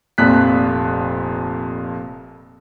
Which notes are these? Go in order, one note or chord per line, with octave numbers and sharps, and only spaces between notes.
F1 F2 A#2 F#6 B6